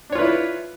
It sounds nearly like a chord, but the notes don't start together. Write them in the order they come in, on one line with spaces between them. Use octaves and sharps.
D4 C#5 F4 B4 E4